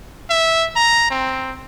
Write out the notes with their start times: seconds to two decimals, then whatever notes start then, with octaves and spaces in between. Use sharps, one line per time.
0.30 E5
0.76 A#5
1.10 C4